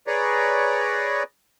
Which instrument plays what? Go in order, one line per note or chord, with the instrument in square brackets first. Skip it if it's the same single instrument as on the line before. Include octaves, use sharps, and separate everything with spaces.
[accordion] G#4 B4 C#5 D5 A#5